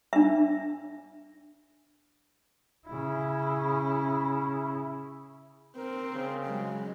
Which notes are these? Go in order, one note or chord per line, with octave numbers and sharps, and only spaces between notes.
D4 E5
C#3 E4
C4 A#4
C#3
F#3 G#3